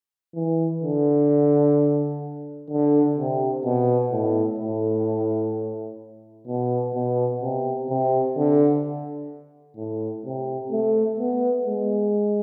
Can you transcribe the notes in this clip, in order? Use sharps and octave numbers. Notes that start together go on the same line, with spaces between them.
E3
D3
D3
C3
B2
A2
A2
B2
B2
C3
C3
D3
A2
C3
A3
B3
G#3